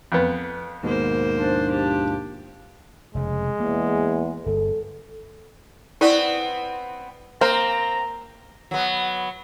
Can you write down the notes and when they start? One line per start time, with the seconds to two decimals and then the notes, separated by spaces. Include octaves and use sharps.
0.12 F2 B3
0.83 D#2 G#2 B2 A#3 C5
1.36 F3 D4
1.71 G4
3.15 F1 C#3 G#3
3.60 E2 A#3
4.46 G1 A4
6.01 B3 C4 E4 B4 D5
7.41 A#3 C4 A#4 C5 A#5
8.71 F#3 B3